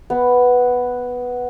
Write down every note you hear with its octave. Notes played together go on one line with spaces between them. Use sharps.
B3